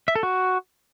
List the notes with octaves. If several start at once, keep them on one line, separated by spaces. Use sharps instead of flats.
E5
A4
F#4